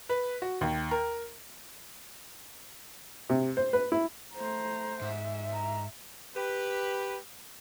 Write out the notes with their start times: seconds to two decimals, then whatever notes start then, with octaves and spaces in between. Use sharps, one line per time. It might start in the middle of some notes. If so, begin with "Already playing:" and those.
0.09 B4
0.42 F#4
0.61 D#2
0.91 A#4
3.30 C3
3.57 C5
3.73 B4
3.92 E4
4.34 A3 C5 A#5
5.01 G#2 E5
5.53 A#5
6.35 G4 B4